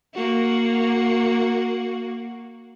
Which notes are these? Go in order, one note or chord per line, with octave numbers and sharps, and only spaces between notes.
A#3 F#4